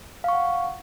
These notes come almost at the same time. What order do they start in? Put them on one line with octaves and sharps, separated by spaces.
F5 C#6 F#5